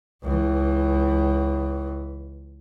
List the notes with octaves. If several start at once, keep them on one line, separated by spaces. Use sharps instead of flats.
C#2 E3